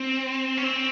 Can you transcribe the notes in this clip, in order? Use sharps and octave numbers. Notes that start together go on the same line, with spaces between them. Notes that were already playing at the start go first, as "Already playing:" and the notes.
Already playing: C4
C#4
C4